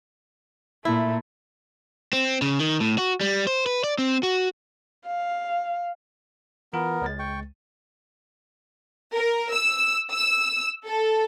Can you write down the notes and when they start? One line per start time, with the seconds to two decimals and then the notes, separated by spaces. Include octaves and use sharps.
0.85 A#2 A3 E4
2.13 C4
2.42 C#3
2.60 D#3
2.80 A2
2.98 F#4
3.21 G3
3.47 C5
3.66 B4
3.84 D5
3.98 C4
4.23 F#4
5.06 F5
6.73 E3 B3 F4 A#4
7.02 C#2 G#3 A6
7.19 G5 C#6
9.15 A#4
9.52 E6
10.12 E6
10.87 A4